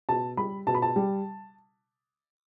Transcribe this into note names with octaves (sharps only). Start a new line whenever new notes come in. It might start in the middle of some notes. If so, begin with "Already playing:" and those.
B2 A5
G3 B5
B2 A5
B5
A5
G3